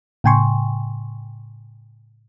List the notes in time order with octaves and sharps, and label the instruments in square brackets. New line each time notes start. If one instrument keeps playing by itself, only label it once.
[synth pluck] A2 C#3 G5 G#5 C6 C#6